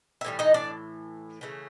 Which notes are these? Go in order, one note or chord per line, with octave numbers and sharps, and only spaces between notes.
E5
A2 E3 G3
D#4 D#5
D4 D5
C#3 E3 A3